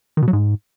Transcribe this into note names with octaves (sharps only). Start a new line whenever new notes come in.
D#3
B2
F#3
G#2